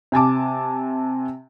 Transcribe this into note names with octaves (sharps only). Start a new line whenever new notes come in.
C3 G#5 A5 D6